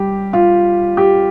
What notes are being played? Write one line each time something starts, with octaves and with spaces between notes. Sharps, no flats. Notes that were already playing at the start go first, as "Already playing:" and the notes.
Already playing: G3 G4
F4
G4